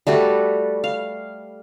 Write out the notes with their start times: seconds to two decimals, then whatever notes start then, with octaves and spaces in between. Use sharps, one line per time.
0.07 G3 A3 F#4 B4
0.84 F5